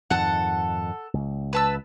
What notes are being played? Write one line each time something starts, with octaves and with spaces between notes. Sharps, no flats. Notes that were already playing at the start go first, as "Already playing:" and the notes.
F2 G#2 D#3 A4 F#5
C#2
B4 A5 E6